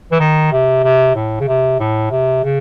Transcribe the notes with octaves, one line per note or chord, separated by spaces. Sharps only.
E3
D#3
C3
C3
A2
C#3
C3
A2
C3
C#3